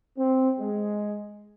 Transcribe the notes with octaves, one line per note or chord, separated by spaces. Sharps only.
C4
G#3